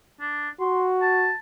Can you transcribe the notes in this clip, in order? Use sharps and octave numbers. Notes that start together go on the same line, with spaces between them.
D4
F#4 C6
A5